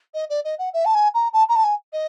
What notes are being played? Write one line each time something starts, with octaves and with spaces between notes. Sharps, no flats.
D#5
D5
D#5
F#5
E5
A5
G#5
A#5
A5
A#5
A5
G#5
D#5